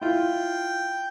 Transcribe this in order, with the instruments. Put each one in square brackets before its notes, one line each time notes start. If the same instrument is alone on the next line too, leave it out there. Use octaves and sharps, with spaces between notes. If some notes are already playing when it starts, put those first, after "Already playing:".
[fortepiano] E4 F4 [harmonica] G5